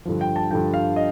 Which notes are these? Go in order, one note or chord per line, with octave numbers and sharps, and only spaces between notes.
G2 D3 F3
G5
A5
G2 D3 F3 G5
F5
D#5